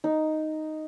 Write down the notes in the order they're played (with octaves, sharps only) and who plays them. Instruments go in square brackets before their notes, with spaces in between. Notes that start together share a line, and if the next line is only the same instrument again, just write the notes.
[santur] D#4